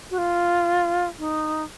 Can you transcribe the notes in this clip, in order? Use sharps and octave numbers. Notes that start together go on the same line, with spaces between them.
F#4
F4
D#4